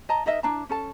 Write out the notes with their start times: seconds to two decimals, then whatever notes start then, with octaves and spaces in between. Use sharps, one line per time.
0.09 D#5 A5 A#5
0.26 D#4 A#4 D#5 E5
0.43 D4 E4 A5 A#5
0.69 C#4 A4 A5